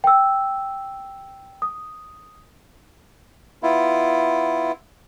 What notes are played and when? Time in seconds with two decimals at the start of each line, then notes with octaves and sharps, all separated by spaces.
0.04 G5 E6
1.62 D#6
3.63 B3 E4 F4